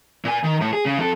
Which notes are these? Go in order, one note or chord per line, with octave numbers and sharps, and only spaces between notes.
A#2 G#5
D#3
A2
G#4
C#3
F2 A4